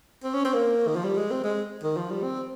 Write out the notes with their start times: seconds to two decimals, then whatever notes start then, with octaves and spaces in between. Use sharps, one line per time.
0.24 C4
0.34 C#4
0.45 C4
0.54 A#3
0.87 D#3
0.96 F3
1.04 G3
1.17 G#3
1.31 C4
1.44 G#3
1.83 D#3
1.97 F3
2.10 G3
2.23 C4